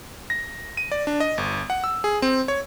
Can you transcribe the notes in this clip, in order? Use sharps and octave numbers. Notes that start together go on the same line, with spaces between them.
A#6
D#7
D5
D4
D#5
G1
F#5
E6
G#4
C4
C#5